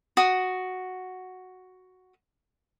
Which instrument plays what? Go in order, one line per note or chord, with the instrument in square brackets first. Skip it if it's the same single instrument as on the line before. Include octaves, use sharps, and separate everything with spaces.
[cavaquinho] F#4 D#6